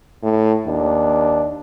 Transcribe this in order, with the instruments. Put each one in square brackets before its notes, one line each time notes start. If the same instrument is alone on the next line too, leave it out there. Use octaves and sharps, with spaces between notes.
[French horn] A2
[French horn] D#2 [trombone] D4